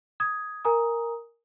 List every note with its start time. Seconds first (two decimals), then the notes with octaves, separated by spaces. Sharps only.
0.20 D#6 G#6
0.65 A#4 G#5 A#5 D#6